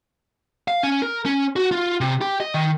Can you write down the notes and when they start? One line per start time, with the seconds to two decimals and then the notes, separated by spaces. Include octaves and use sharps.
0.68 F5
0.83 C#4
1.02 A#4
1.25 C#4
1.56 F#4
1.71 F4
2.01 C3
2.21 G4
2.40 D#5
2.54 D#3